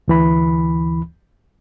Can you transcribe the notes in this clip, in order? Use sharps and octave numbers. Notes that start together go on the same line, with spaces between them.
D2 E3 B5